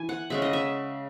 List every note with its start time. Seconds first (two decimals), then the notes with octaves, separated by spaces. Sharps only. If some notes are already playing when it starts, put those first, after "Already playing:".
Already playing: E3 G#5
0.09 F#5
0.30 C#3 G#3 C#4 E5
0.42 D#5
0.53 E5